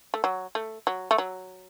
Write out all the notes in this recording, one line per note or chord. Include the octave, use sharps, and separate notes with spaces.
A3
F#3
A3
F#3
A3
F#3